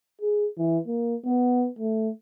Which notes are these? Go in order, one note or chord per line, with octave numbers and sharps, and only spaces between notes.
G#4
E3
A#3
B3
A3